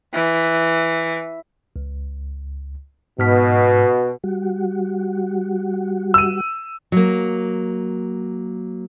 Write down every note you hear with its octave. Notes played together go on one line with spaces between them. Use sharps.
E3
C#2
G#2 B2 F6 B6
G3 F#4
E6 D#7
F#3 A#3